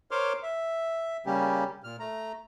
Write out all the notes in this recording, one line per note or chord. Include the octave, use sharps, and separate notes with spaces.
A#4 C5 C#5 C6 D6 F6
E5
C#3 G3 A#3 C#4 G4
A#2 F6
A3 A#5